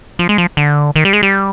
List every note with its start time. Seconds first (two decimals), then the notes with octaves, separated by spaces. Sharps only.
0.19 F3
0.29 G#3
0.38 F3
0.57 D3
0.96 D#3
1.05 G3
1.13 G#3
1.23 G3